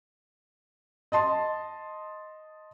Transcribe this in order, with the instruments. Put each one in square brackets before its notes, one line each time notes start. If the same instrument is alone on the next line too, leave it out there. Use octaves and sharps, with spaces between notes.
[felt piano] D#5 A5 C6